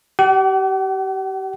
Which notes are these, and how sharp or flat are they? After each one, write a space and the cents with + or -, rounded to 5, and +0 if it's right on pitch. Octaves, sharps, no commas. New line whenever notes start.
G4 -30 F#5 +45